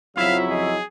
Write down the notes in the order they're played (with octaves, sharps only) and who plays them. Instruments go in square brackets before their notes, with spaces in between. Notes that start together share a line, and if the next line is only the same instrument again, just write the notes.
[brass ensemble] F2 C#3 F#3 [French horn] F3 [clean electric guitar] E4 E5 [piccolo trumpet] F5
[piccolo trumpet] G#4 [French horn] D#5